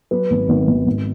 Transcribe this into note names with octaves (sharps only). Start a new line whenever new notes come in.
F#3 B4
G#1
G#1
G#1
G#1